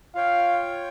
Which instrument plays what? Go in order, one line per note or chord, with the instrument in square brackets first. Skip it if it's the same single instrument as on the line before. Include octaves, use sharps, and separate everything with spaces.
[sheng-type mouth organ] F4 C#5 G5 [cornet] F5